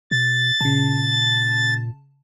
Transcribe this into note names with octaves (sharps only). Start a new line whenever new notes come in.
B2 A6
A#2 C#3 A5